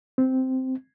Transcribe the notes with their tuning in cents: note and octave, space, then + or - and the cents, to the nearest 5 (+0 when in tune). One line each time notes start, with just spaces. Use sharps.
C4 -10